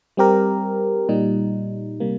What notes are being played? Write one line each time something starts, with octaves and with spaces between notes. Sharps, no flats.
G3 C4 G4 A#4
A#2 G3 D#4
C3 G3 A#3